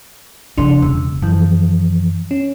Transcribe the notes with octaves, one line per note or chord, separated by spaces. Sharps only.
F2 C#3 D4 C6
E1 C#3
F#2 E3 F3
C#4